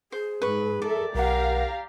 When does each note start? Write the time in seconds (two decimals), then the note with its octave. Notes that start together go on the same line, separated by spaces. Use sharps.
0.12 G#4 C5
0.42 G#2 B4 C#6
0.82 A4 A#4 D5 E5
1.15 B1 G4 A#4 F5 F#5 A#5